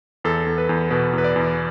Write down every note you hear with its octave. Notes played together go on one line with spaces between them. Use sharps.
E2 A4
E2
B4
E2
B2 B4
E2 B4
D5
E2